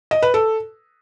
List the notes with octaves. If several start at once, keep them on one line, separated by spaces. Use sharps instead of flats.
D#5
B4
A4